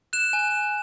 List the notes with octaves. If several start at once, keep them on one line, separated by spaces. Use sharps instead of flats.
F#6 E7
G#5